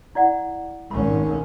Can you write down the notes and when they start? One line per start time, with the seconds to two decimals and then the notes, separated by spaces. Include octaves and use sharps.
0.15 E4 D5 F#5
0.91 G#1 C#4 B5